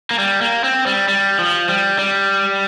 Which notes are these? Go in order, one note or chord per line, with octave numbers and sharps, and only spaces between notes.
A#3
G3
A#3
C4
G3
G3
F3
G3
G3